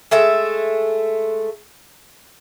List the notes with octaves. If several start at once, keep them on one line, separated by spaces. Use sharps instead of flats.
G#3 A3 A4 E5